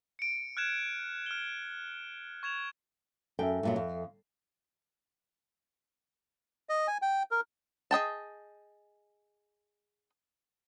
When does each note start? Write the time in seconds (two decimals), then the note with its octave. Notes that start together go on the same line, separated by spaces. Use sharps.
0.19 C#7 D7
0.57 F6 F#6 G#6 E7
1.26 F6 G7
2.43 C#6 G#6 E7 F7
3.39 F#2 A4 E5 G5
3.63 G2 A#2 F#3
3.76 F2
6.69 D#5
6.88 G#5
7.02 G5
7.31 A#4
7.91 G#4 D#5 G5 A5